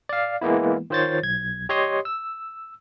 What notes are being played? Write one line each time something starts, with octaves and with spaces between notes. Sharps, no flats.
D5 F5
E3 G#3 A#3 B3 E4
D#3 F4 C5 C#5 A6
B1 G#6
G4 C#5 D#5 C6 D#6
E6